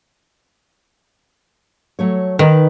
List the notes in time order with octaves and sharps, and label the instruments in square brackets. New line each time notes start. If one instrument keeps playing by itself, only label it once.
[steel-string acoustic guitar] F#3 A3 C#5
[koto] D#3 [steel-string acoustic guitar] D#4 B4